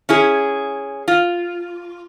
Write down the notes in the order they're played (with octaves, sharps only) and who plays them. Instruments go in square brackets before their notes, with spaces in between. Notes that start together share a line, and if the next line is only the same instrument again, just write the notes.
[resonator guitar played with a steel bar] C#4 E4 G#4
F4